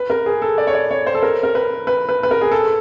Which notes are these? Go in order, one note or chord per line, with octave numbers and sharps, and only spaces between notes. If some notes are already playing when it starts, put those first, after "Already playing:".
Already playing: B4
A#4
G#4
A4
D5
C#5
D5
C#5
C5
A4
A#4
A#4
B4
B4
B4
B4
A#4
G#4
A4